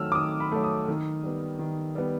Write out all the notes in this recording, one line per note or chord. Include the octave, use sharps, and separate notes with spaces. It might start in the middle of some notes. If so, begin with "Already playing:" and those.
Already playing: D#3 F#3 A3 E6 F6
D6
D#3 D#6
B5
F#3 A3
D#6
D#3
G3 B3
D#3
G3 B3